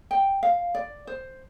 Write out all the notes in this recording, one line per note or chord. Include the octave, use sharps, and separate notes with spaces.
G5
F5
D5
C5